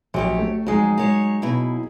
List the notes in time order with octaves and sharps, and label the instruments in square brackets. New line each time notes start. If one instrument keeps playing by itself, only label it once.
[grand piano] A#1 [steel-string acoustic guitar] F#3 G4 C#5
[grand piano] A3
[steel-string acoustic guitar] F2 G#3 [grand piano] F#3 D#4 G#4
[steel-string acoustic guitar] G#3 C#5
B2 E4